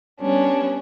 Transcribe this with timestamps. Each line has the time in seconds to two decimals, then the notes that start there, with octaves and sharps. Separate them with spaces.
0.20 G3 B3 C#4 D4